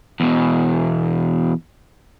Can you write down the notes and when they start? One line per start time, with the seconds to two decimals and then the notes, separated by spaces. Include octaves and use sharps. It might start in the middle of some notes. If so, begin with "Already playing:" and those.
0.20 E2 B2